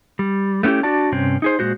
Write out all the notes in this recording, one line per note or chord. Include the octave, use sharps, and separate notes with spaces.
G3
A3 B3 C#4 E4 G4
D4 F#4 D5 A5
G2 C3 C4 C#4
D#4 G#4 C5
A#2 E3 G#3 F#4 C5